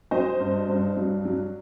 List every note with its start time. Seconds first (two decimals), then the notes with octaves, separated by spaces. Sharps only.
0.11 F#3 C5 D#5
0.40 G2
0.68 G2
0.97 F#3
1.25 F#3